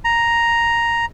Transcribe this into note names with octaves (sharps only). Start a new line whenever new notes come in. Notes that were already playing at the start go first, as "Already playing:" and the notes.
A#5